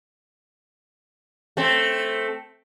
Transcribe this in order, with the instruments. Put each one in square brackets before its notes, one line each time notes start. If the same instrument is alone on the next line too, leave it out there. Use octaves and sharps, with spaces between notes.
[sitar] A3 C4